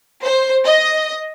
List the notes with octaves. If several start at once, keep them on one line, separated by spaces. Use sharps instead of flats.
C5
D#5